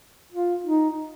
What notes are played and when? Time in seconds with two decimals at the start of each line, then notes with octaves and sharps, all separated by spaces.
0.32 F4
0.65 D#4